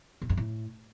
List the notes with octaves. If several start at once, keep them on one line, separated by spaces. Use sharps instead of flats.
C3
G2
A2